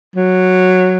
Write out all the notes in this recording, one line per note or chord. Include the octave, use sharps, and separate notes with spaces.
F#3